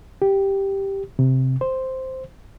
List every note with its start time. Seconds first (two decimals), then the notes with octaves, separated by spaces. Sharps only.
0.22 G4
1.19 C3
1.61 C5